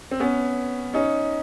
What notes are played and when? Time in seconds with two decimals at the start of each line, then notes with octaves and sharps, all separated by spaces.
0.11 C4
0.20 B3 C#4
0.93 C#4 D#4